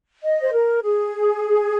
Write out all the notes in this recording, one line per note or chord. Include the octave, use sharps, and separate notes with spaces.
D#5
C5
A#4
G#4